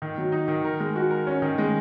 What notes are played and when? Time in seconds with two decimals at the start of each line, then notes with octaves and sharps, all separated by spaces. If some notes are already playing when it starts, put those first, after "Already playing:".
0.02 D#3
0.18 F#3
0.32 D#4
0.48 D#3
0.64 A#4
0.80 G#3
0.96 F#4
1.10 A#4
1.27 C#4
1.42 D#3
1.58 G#3